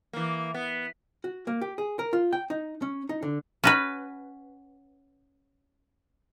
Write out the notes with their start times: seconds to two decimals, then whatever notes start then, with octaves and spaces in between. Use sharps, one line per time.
0.13 E3 A#3
0.54 B3
1.24 F#4
1.47 A#3
1.61 G4
1.78 G#4
1.99 A#4
2.13 F4
2.33 G5
2.50 D#4
2.82 C#4
3.09 D#4
3.23 D3
3.64 C#4 F#4 B4